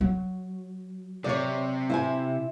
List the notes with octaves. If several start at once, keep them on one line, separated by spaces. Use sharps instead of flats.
F#3
C3 C#5 D5
E4 C5 G#5